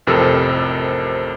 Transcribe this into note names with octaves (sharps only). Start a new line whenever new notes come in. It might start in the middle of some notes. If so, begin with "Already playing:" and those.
A1 F2 C3 A4 A#4 E6